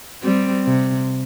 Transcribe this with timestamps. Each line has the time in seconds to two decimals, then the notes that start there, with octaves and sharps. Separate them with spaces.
0.23 G3 C4
0.66 C3